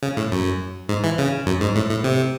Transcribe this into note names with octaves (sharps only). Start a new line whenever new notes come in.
C#3
A2
F#2
G#2
E3
C#3
F#2
G#2
A2
A2
C3